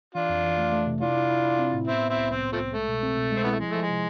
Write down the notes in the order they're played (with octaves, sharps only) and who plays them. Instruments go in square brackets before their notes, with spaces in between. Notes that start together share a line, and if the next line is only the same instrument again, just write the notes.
[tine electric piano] E3 [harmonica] D4 F4
[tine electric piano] F2
E3
A3
A3
C3
[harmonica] D4 F4 [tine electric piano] E4
[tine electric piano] E4
E4
E4
C4
A2
[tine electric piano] B3 [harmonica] C4 E4
[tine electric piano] B3
[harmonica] C4 E4
[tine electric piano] C2
[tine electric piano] C2 [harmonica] C4
[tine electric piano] C2
[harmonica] F3 A3 C4
[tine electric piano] C2
[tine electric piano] G#3 [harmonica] A3
[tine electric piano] B2
C4
B2
[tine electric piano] G#3 [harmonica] C4
[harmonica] B3 [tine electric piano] E4
[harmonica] A3
[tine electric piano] F3 [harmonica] G#3
[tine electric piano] F3 [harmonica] A3
[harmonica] G#3
[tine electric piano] C3